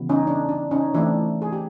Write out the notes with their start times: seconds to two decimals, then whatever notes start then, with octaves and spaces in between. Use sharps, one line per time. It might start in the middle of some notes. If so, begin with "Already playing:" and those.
Already playing: C#3 E3 G3 B3
0.09 C#4 D#4
0.27 D4
0.49 D4
0.71 C#4 D#4
0.94 E3 A3 C4 D4 E4
1.42 G#4
1.52 G4